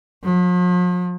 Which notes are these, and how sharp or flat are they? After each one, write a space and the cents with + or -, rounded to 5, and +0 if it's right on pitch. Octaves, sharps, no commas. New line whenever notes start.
F3 +45